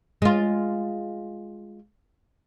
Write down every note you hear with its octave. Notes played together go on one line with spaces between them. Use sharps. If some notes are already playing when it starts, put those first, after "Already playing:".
G#3 F4